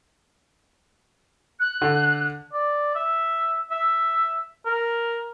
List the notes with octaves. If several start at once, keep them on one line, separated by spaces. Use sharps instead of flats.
F#6
D3
D5
E5
E5
A#4